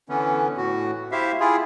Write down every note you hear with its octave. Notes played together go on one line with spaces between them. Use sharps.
D3 E3 B3 C#4
A2 F#4
E4 G4 C5 E5 F5
E4 F4 G#4